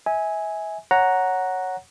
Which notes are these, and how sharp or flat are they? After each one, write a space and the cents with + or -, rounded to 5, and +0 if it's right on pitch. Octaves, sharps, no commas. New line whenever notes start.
E5 -30 G#5 +0
C#5 +0 F#5 +0 A#5 +0